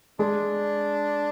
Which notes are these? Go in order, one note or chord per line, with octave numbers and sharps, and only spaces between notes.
G#3 D4